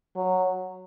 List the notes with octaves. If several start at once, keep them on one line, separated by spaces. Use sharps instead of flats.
F#3